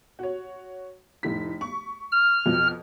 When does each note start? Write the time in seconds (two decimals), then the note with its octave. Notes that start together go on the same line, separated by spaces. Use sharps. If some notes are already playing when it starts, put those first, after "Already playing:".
0.19 F#4 C#5
1.23 F1 A2 B6
1.61 C#6
2.12 F6
2.46 F2 B2 F3